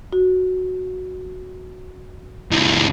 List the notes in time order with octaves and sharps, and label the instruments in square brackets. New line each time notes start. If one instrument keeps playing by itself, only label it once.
[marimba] F#4
[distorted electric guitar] C#2 E3